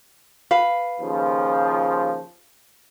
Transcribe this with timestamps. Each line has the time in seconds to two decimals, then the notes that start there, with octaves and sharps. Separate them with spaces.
0.51 B4 F5
1.01 D#2 C#3 F3